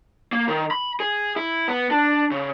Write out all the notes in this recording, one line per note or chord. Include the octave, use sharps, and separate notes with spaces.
A#3
D#3
B5
G#4
E4
B3
D4
C#3